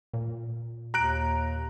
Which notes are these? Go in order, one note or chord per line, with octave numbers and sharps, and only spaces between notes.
A#2
D#2 A#5 F#6 D7